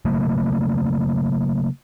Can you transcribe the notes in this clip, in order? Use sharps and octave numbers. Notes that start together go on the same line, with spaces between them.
C#3 F#3 A3 A#3